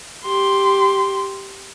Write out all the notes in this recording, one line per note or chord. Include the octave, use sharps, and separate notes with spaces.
G4 C6